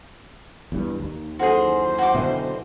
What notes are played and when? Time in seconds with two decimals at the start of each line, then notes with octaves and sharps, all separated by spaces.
0.72 E2 G2
1.00 D#2
1.39 F#2 E3 D#4 F#4 G#4 A4 C5 G#5
1.98 F#4 D6
2.15 B2 D3 E5 F#5 G5